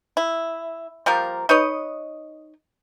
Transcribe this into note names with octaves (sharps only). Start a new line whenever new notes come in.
E4
F3 G3 A#3 A#4
D#4 B4 C#5 D#5